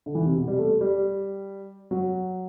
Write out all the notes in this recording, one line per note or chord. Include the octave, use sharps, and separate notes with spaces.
D3
E3
C3
B2
G3
A3
G3
F#3